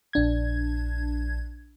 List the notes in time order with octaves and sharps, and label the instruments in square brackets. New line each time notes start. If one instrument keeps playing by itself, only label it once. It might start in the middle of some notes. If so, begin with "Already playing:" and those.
[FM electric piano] A#1 D4 G#6